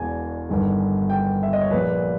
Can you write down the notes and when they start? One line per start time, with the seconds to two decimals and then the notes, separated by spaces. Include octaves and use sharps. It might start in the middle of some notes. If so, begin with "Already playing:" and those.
Already playing: E1 E2 B2 G#5
0.49 G1 G2 D#3
1.10 G5
1.43 E5
1.53 D#5
1.61 C#5
1.71 A#1 A#2 B4